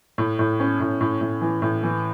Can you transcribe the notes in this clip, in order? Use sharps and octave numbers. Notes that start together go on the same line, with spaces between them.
A2
A2
C#4
A2
A2
A2
E3
A2
E3